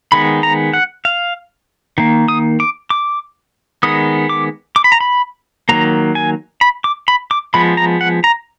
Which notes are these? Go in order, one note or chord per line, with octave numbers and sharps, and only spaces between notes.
D#3 G#3 B3 B5
A#5
F#5
F5
D#3 A#3
D#6
D6
D6
D#3 G#3 B3 D#6
D6
D6
B5
A#5
B5
D#3 F#3 A#3 A#5
G#5
B5
D6
B5
D6
F3 G#3 B3 B5
A#5
F#5
A#5